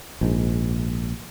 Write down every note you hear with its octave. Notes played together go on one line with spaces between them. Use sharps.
A#1 G#2